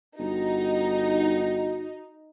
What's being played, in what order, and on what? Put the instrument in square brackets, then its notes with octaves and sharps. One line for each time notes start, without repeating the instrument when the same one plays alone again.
[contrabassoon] G1 [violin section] D#4 [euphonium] F#4